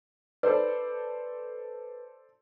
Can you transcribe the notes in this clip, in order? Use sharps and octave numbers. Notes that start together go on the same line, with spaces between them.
A4 B4 C5 D5